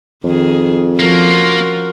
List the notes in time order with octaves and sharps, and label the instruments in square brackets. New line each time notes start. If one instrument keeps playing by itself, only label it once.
[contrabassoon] F2 [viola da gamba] D#3 G#4
[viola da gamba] F3 C#4 F4 [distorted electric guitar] A#3 [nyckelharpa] F#4 A#4